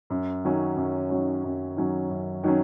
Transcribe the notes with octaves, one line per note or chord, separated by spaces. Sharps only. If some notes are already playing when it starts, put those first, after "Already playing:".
F#2
D#3 F#3 C#4
F#2
D#3 F#3 C#4
F#2
D#3 F#3 C#4
F#2
D#3 F#3 C#4